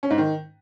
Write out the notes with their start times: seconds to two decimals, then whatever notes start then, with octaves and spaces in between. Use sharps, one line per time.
0.03 C#4
0.10 G#2
0.18 D#3